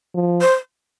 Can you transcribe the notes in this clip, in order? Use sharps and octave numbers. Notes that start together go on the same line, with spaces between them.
F3
C5